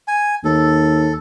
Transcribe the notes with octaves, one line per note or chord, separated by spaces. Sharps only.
G#5
D#2 A4